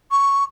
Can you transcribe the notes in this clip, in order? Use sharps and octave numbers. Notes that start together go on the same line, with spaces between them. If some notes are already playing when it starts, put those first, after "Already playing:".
C#6